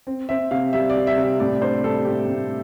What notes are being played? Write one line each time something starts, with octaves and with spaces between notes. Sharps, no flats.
C4
C4 E5
C3 F5
G3 E5
D5
G3
E5
C3
E5
A2 D5
D4 C5
G3 A4
A2 G4
A2